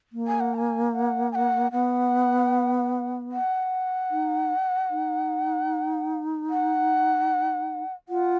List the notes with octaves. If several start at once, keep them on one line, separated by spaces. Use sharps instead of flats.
A#3
G#5
F#5
A#5
G#5
F#5
G#5
F#5
B3 F#5
F#5
D#4
D#4
F#5
F4 F#5